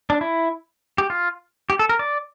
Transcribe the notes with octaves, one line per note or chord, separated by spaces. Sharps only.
D4
E4
G4
F4
G4
A4
A#4
D5